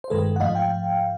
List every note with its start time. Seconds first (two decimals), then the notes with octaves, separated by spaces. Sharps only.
0.04 C5
0.10 G2 D#3 G#3 A4 B4
0.36 F#5
0.40 G#2 F3 A3 D#5 F5
0.55 F5 G5